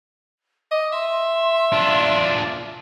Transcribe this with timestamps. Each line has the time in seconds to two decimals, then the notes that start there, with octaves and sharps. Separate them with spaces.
0.71 D#5 D6
0.93 E5 C6
1.72 D4 F4